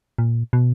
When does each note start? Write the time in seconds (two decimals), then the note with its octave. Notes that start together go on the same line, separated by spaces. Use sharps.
0.18 A#2
0.53 B2